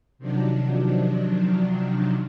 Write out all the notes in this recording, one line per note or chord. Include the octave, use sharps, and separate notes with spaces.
C3 D#3 F3 F#3 D4